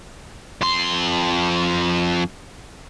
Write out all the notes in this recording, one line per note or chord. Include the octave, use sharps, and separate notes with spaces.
F2 C6